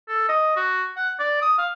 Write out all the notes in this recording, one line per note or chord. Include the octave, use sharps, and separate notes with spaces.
A4
D#5
F#4
F#5
D5
D#6
F5